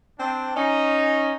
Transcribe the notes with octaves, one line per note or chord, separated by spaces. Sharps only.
C4 D4
C#4 D#4